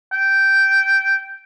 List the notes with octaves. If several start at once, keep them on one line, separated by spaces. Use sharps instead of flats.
G5